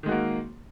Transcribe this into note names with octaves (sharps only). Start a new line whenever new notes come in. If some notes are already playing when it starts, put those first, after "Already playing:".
D#3 G#3 A#3 F#4